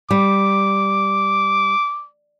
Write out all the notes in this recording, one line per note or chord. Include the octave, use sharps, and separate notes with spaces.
G3 D6